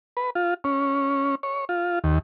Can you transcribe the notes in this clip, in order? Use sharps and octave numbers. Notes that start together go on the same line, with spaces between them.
B4
F4
C#4
C#5
F4
D#2